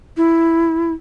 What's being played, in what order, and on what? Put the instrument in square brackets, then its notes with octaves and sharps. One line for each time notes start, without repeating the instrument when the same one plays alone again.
[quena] E4